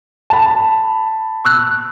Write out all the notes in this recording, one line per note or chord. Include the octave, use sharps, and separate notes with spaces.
A5 B5
C#6 E6 F#6